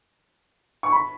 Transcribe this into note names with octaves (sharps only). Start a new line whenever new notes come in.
C#6
B5